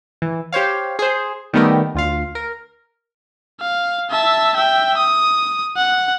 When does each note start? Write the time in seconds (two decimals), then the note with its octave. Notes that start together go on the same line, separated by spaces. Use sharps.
0.22 E3
0.53 G4 C5 C#5 F5
0.99 G#4 C5
1.53 D#3 G3 A3 B3 G4 A#4
1.95 D2 F4 F5
2.35 A#4
3.60 F5
4.10 E5 A5
4.55 E5 G5
4.97 D#6
5.77 F#5